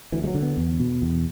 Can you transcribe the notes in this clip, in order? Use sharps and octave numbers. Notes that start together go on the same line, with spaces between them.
D2 E3
G#3
F#3
D3
B3
E2
B2
E2